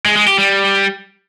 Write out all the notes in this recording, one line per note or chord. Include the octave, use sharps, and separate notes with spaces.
G#3
G#3
G4
G3